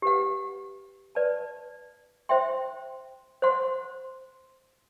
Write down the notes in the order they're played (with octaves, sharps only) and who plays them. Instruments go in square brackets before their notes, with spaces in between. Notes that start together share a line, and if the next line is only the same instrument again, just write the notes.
[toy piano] G4 B4 F#5
B4 D5 A5
C5 E5 G5 C6
C5 F#5 C6